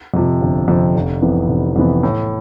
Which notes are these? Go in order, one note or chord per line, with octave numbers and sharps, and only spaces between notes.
F2 C3 F3
G1
F2 C3 F3
F1
F2 C3 E3 B3
F1
F2 C3 E3 B3
A2